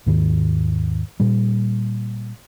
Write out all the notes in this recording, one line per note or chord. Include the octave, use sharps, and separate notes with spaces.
D#2 G#2 D#3
A#2 G3